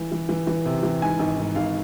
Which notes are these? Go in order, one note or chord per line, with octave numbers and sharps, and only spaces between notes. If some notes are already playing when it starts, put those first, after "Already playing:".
Already playing: E3
E3
E3
E3
C3
E3
G#2 G#5
G#1
G#2
G#1 F5